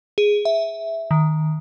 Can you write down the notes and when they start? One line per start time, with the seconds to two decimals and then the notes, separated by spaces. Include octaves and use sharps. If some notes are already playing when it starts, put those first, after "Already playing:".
0.18 G#4
0.45 E5
1.11 D#3